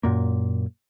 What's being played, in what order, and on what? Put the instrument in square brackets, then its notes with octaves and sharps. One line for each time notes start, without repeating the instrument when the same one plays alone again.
[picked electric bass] F#2 A#2 A#3